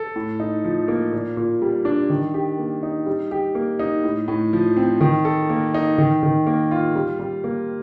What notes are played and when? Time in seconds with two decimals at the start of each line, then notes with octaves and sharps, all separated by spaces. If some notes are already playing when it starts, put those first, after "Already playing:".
Already playing: A4
0.16 A2
0.40 D#4
0.65 F3
0.88 A#3
1.12 A#2
1.37 A#2
1.62 G3
1.85 D4
2.10 D#3
2.34 G4
2.59 A#3
2.83 D#4
3.06 G3
3.31 G4
3.55 A#3
3.79 D#4
4.04 A2
4.28 A2
4.53 F3
4.77 C4
5.01 D#3
5.25 A4
5.50 A#3
5.74 D#4
5.98 D#3
6.23 D#3
6.47 A#3
6.71 F4
6.95 G3
7.19 G3
7.44 A#3